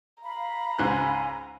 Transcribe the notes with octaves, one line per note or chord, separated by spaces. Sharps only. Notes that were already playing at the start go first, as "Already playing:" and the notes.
F5 A#5 B5
C#2 G#2 G#5 F#6